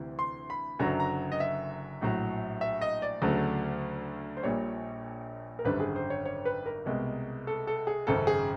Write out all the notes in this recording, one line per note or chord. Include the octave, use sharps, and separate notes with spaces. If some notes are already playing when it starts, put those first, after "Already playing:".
Already playing: D2 C3 E3
C6
B5
F#1 F#2 D3 F#3 A#5
A#5
D#5
E5
A#1 A2 F#3
E5
D#5
D5
D2 C#3 F#3 A3
C5
A#1 A#2 G3 C#5
A#4
G#1 F#2 D3 G3 B4
G#4
C5
C#5
C#5
B4
A#4
C2 B2 G#3
A4
A4
G#4
G#1 F#2 C#3 A4
G#4